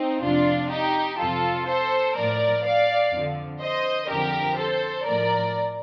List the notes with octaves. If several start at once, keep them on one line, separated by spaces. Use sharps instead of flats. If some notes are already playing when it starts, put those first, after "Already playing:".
Already playing: C4 D#4
F2 C3 F3 D4 F4
D#4 G4
F2 C3 F3 F4 A4
A4 C5
A2 F3 A#4 D5
D5 F5
F2 D3 F3
C5 D#5
F2 D3 F3 G4 A#4
A4 C5
A2 F3 A#4 D5